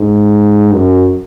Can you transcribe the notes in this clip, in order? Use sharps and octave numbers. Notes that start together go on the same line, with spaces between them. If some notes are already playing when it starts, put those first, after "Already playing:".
Already playing: G#2
F#2